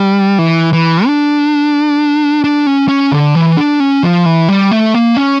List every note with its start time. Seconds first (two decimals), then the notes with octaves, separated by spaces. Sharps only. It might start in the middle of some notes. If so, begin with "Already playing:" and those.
Already playing: G3
0.39 E3
0.73 E3
1.06 D4
2.44 D4
2.67 C#4
2.89 C#4
3.12 D3
3.35 E3
3.57 D4
3.80 C#4
4.03 F3
4.26 E3
4.49 G3
4.71 A3
4.94 A#3
5.17 C#4